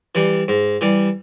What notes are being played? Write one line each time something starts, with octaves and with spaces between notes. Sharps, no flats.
E3 G3
G#2
E3 G3